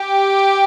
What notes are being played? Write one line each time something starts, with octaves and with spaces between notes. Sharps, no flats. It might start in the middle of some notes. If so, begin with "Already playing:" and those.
Already playing: G4